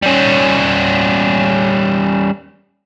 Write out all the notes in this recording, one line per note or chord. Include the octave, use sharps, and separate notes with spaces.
G3 C#4